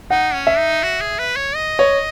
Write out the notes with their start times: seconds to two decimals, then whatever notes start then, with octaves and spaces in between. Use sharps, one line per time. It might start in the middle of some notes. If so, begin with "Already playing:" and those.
0.10 D#4 F#5
0.34 C#4
0.47 E5
0.58 D#4
0.83 F#4
1.01 G#4
1.19 B4
1.37 C#5
1.55 D#5
1.79 C#5